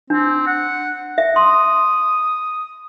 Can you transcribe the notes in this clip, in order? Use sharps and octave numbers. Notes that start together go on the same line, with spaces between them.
C4 D4
F#5
E5
C6 D#6